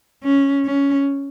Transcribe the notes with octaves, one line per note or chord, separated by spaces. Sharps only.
C#4
C#4